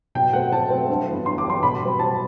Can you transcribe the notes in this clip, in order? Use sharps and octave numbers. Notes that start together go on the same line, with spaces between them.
B2 G5
A3 C4 F#5
B2 A5
A3 C4
G2
E3 B3
G2 C6
D6
E3 B3 C6
B2 B5
G3 C4
B2 A5